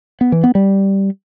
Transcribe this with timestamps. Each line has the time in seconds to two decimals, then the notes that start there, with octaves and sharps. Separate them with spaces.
0.21 B3
0.32 E3
0.44 B3
0.55 G3